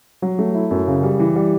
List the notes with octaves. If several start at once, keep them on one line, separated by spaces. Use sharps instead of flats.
F#3
A3
E4
F#2
C#3
G3
E3
G3